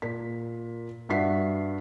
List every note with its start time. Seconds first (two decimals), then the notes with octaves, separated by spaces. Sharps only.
0.02 A#2 B6
1.09 G2 F#4 E5 F#5 B6 C7